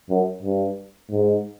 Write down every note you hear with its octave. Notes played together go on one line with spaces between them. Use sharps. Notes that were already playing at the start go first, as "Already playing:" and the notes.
F#2
G2
G#2